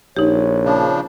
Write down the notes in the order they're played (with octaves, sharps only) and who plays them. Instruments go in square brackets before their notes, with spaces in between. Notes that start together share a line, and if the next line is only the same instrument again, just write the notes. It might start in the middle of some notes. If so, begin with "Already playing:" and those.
[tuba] A#1 [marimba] D#4 G4 [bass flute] C#5
[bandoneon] C#3 F3 D4